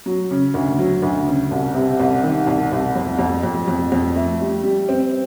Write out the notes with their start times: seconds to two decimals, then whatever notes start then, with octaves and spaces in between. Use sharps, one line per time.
0.06 F#3
0.31 C#3
0.54 D2
0.78 F#3
1.03 D2
1.26 C#3
1.51 C2
1.74 C3
1.99 C2
2.23 D#3
2.47 C2
2.72 C2
2.96 F2
3.19 F2
3.43 F2
3.68 F2
3.92 F2
4.16 A3
4.40 G3
4.64 G3
4.89 C4